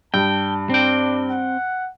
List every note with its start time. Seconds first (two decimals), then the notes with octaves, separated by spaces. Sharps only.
0.14 G2 G5 A5
0.70 C4 D4 G5
1.29 F#5